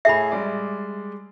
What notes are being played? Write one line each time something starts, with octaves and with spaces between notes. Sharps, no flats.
A2 G#4 E5 B5 C7
G3 G#3 D5